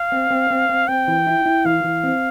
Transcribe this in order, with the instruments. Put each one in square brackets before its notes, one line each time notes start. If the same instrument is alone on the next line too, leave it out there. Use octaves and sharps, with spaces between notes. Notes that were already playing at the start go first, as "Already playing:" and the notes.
Already playing: [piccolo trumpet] F5
[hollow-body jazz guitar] C4
C4
C4
C4
[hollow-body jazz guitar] C4 [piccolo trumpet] G5
[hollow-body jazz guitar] E3
E4
E4
[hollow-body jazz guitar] E3 [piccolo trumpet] F5
[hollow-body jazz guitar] E3
C4